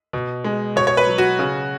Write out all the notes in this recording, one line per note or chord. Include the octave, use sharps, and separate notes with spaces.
B2
G#3
B2 C#5
C#5
B4
F#3
F#4
C#3